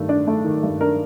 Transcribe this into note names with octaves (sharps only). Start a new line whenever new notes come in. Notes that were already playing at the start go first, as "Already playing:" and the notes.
Already playing: G2 D#3 A3
D4
A3
D#3
G2
D4 A#4